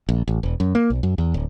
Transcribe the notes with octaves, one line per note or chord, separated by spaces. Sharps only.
A#1
A1
E1
F#2
A#3
B1
F#2
E2
D1